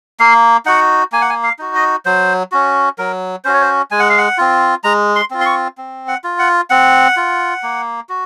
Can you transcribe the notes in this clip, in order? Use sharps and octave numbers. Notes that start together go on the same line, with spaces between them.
A#3 F5
D#4 F#4 F#5
A#3 G#5
F#5
G#5
F5
D#4 F#4
D#5
F#3 C5
C#4 F#4
F#3 A#4
C#4 F#4 C5
C#5
C5
G#3 G#5
F#5
F5
F#5
C4 F4
G#3 A#5
C6
C4 F4
C6
C#6
C4
F#5
F4
F#5
C4 F#5
F4
A#3
F#4